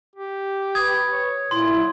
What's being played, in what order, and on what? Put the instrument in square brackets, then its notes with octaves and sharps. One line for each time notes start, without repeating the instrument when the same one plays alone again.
[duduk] G4
[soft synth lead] B4 [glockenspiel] D#6 G#6
[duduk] C#5
[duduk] A#2 [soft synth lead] E4 [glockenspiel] C6
[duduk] F#3